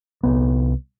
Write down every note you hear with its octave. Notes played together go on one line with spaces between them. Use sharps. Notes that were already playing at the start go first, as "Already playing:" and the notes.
C2 B3